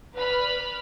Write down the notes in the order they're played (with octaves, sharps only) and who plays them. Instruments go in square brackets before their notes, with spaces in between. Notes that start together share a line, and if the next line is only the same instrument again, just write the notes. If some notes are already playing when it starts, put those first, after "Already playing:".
[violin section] B4 D5 B5 F6